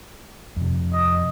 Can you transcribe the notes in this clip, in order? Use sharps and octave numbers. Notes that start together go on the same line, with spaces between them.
F2 C3
D#5